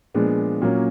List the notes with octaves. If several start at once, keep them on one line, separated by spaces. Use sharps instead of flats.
A#2 F3 G#3 B3 D4
A#2 F#3 A#3 C#4